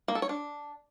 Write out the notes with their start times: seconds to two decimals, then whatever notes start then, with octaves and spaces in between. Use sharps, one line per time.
0.08 A#3
0.15 A4
0.22 C#5
0.29 D4